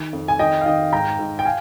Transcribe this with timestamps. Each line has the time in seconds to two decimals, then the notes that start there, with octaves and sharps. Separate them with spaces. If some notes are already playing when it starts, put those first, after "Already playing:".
Already playing: D#3
0.13 F2
0.28 G#5
0.39 D#3 D#5 G5
0.61 F5
0.66 D#3 D#5 G5
0.92 G#2 G5 A#5
1.19 G#2
1.39 G5
1.45 F5 G#5